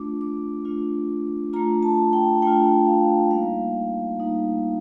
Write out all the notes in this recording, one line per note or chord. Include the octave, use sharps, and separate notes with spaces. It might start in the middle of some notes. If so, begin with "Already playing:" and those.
Already playing: A3 D4 F4 D6
D6
A3 D4 F4
A3 D4 F4 A#5
A5
G5
A3 D4 F4 G5
F5
G3 A#3 D#4 F5
G3 A#3 D#4